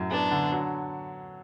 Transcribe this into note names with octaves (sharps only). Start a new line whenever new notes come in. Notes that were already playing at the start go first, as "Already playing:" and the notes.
Already playing: F#2 A2 F#3
B3 D4
D3
F#3